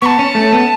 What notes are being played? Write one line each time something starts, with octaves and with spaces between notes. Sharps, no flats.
B3 A5 C#6
C#4
A3
B3